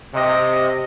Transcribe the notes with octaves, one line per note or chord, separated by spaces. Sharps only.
C3 D#5